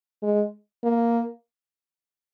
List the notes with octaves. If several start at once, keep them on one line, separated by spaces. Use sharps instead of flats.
G#3
A#3